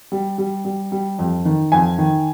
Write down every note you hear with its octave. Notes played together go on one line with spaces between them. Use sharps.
G3
G3
G3
G3
F2
D#3
F2 G#5
D#3